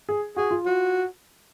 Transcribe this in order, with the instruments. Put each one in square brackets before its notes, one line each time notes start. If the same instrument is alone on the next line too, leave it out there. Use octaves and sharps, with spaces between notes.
[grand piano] G#4
[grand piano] F#4 [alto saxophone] G#4
[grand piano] F4
[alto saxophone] F#4